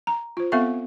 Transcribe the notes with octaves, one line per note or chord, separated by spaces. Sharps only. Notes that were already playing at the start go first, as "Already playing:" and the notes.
A#5
F4 C5
B3 C4 A4 E5 F5 C#6